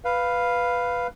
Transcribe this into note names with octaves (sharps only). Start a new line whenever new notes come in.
B4 F5